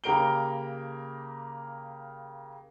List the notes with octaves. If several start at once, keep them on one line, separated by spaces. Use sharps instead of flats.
C#3 A#3 G4 A#4 D7 G7